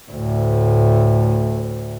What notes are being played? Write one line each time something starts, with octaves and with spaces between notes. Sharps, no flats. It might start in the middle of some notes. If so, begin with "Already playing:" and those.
D2 A2